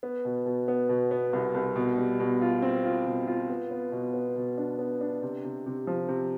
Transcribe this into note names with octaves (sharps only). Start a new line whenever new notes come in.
B3
B2
B2
B3
B2
B3
C2
C2
B2
G3
B2
F4
C4
F4
B2
F4
B3
B3
B2
B3
B2
D4
B3
D4
C3
C3
C3
F3
C3